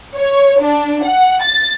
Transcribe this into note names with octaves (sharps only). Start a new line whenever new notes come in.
C#5
D4
F#5
A6